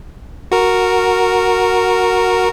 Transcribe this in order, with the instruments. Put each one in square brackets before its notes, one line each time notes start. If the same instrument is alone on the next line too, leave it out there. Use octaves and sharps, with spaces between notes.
[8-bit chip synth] F#4 A#4